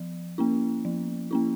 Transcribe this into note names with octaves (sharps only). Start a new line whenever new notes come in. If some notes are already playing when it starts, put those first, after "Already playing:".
Already playing: F3
A#3 C#4 E4
F3
A#3 C#4 E4